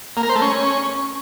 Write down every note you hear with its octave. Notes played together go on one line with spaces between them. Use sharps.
A#3
A#4
C5
A3
C#4